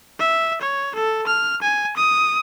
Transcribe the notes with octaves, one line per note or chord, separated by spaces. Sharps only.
E5
C#5
A4
F6
G#5
D#6